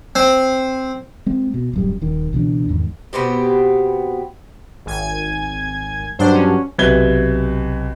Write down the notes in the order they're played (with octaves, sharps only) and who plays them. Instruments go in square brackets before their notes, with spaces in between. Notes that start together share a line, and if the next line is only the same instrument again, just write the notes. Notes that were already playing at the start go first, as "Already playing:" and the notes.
[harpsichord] C4
[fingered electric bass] G#3 C4
B2
D1 F#2 G3
D#1 D#3
C#2 B2 E3 D4
E2 G#2 D#3
[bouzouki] B2 B3 C4 G4
[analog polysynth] G#1 G#5 G#6
[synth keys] G2 F#3 D4 [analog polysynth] C5
[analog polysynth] C#4
[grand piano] B1 C3 B4 E5 G#6 G7